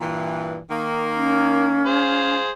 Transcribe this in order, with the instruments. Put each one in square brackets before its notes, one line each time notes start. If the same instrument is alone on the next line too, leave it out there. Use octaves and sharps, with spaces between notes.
[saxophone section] G2 A#2 E3
D#3 A#3
[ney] C#4
[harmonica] G#4 C5 F5